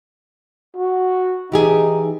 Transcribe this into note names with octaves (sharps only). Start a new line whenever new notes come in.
F#4
E3 D#4 G4 G#4